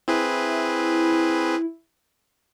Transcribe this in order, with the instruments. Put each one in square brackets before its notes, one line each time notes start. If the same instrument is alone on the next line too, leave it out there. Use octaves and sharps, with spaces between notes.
[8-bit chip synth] C4 G#4 B4 [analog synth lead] E4